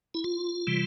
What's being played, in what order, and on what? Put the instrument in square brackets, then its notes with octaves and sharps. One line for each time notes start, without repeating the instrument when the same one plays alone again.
[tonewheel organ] E4
F4
C3 E3 G3